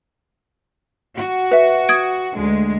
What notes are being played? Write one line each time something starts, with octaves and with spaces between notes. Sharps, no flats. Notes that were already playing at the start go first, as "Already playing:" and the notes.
F#4
B4 E5
D#6 G#6 D7
D2 G#3